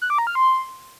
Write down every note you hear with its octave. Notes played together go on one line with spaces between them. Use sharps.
F#6
D6
A#5
F6
C6